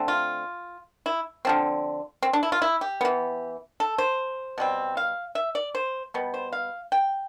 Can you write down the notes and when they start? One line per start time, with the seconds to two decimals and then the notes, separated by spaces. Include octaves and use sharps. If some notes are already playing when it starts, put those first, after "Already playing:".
Already playing: D3 A3 C4
0.08 F4
1.06 E4
1.45 D3 F3 C4
2.23 C4
2.33 D4
2.43 E4
2.52 F4
2.62 E4
2.81 G4
3.01 E3 B3
3.80 A4
3.98 C5
4.58 B2 G3 C4
4.97 F5
5.35 E5
5.55 D5
5.75 C5
6.14 B2 G3 B3
6.34 C5
6.53 F5
6.92 G5